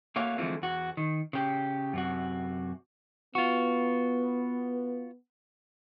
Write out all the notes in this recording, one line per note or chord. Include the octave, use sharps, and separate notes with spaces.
A3 A#3 F#4 C#5 F5
D3 E3 F3 G#3 A3 C4
E2 F#4
D#3
C#3 G4
F#2 C3 F#4
B3 F4 F#4